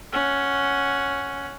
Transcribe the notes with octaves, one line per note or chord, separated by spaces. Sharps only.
C#4 F#5